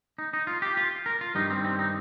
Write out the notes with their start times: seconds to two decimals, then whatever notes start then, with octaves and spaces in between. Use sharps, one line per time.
0.18 D#4
0.33 D#4
0.47 F4
0.62 G4
0.77 F4
1.06 A#4
1.21 F4
1.35 G2 D#3 G3 D#4
1.50 C4
1.65 C4
1.79 D#4